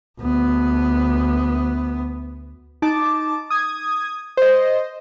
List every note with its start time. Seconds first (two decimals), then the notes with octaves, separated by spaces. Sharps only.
0.20 D2 B3
2.82 D#4 A5 D6
3.50 D#6 G#6
4.37 C5 D#5